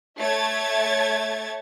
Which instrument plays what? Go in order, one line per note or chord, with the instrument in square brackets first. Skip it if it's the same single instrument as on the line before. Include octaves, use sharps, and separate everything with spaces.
[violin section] A3 C#5 E5 G#6 A6